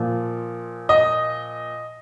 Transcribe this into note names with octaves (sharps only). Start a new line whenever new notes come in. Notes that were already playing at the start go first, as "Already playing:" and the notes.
Already playing: A#2 F3
D#5